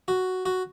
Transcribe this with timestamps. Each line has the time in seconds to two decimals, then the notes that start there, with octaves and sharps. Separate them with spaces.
0.08 F#4
0.46 F#4